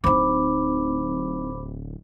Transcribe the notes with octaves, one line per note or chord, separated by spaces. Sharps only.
D1 C4 D#4 C5 B5 D6